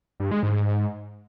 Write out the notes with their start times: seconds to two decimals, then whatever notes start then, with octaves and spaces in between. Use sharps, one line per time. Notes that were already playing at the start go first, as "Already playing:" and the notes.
0.20 G2
0.31 G#3
0.43 G#2